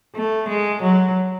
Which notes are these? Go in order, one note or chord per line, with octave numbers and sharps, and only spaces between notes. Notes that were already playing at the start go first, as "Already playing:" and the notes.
A3
G#3
F#3